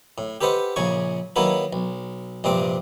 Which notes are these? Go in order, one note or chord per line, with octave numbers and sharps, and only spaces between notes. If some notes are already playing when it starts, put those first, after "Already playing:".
A2
G4 A4 B4 C5 D#5 F#5
A#1 C#3 G#5 C#6
D#3 F#3 A#3 B3 E4 A4
B1
A#1 G2 C3 C4 D6